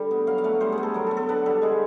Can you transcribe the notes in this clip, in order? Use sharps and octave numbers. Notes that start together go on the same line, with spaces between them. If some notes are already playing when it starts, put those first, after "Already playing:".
Already playing: D3 G3
B3
F#3 F5
F5
A3 F#5
G3 C5
G#4
B3
A4
F#3 A#4
B3 A4
A4
D3 B4
G3 A4
G#3 G#4